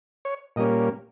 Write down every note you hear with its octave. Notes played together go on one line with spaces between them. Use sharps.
C#5
A#2 G3 A#3 C#4 D#5